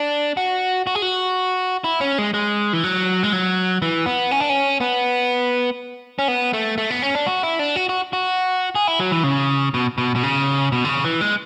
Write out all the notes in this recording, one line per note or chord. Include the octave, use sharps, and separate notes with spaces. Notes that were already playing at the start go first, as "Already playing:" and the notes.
Already playing: D4
F#4
F#4
G#4
F#4
E4
C#4
G#3
G#3
E3
F#3
G#3
F#3
E3
B3
C#4
D4
C#4
B3
C#4
B3
A3
A3
B3
C#4
D4
F#4
E4
D4
F#4
F#4
F#4
G#4
E4
F#3
E3
C#3
B2
B2
B2
C#3
B2
D3
C#3
E3
G#3